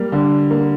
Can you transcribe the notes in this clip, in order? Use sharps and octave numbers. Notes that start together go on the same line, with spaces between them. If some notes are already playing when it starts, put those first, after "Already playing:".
Already playing: G3 A#3
D3
A#3